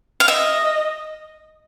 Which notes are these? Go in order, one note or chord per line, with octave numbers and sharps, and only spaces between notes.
F5
D#5 E5